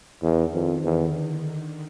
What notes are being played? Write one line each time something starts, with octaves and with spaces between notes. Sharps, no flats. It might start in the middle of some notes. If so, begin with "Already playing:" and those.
E2 D#3
F2
E2 D3